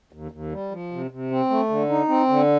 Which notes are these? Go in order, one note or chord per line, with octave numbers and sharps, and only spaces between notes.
D#2
D#2
G3
F3
C3
C3
C4
A3
D3
D#4
C4
D3